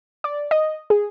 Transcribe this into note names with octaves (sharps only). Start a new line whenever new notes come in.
D5
D#5
G#4